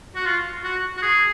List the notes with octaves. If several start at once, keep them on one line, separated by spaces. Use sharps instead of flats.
F#4
F4
F#4
F#4
G#4